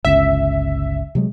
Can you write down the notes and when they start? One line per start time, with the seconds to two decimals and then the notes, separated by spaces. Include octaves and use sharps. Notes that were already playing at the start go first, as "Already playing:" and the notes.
0.05 G1 C#2 C#4 E5
1.15 C3 F#3 G#3